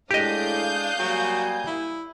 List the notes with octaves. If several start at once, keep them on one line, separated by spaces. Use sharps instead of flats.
A2 G#3 D4 G4 D#5 F5 D#6 G6
F#3 G3 A#3 G#5
E4